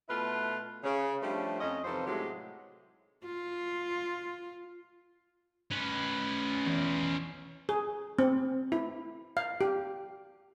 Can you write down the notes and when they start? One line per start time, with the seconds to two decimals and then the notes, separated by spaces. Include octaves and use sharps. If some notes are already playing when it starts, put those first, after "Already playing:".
0.08 B2 A3 E4 F4 B4
0.84 C#3
1.22 F3 G3 A3 C#4 D4 C5
1.61 F2 C#4 D#5
1.85 C3 E3 F3 D#4 A4 C5
2.07 A2 C3 F#3 G#3 A3 G4
3.25 F4
5.71 C#4 B4
6.66 E2
7.69 G#4
8.19 C4
8.72 E4
9.37 F5
9.61 G4